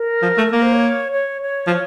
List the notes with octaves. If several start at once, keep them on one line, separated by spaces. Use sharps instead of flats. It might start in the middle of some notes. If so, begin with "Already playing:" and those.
Already playing: A#4
F3
A3
A#3 A#4
C5
C#5
C#5
C#5
F3